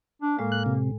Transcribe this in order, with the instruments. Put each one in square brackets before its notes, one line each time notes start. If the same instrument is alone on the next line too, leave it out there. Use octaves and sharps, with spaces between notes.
[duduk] D4
[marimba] A2 G#3 [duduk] A#3
[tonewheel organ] F#6
C3